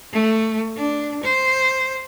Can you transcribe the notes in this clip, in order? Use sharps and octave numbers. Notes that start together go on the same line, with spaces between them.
A3
D4
C5